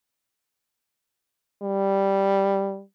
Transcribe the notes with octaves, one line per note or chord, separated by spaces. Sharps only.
G3